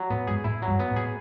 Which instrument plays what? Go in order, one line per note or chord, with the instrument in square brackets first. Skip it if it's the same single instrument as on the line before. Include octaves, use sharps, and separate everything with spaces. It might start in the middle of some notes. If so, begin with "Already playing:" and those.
Already playing: [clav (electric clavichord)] F#3
[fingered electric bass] A2 [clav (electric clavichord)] B3
[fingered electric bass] G#2 [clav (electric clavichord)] G#4
[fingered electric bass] A2 [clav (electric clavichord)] E4
[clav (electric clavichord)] F#3
[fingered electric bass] G2
[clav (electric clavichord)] B3
[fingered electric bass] A2
[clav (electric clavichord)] G#4